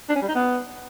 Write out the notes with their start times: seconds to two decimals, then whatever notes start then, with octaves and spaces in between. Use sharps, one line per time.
0.09 D4
0.16 C#4
0.22 G3
0.28 D#4
0.35 B3